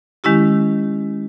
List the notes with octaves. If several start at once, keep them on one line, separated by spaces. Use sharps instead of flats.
D#3 G#3 C#4 E4 G4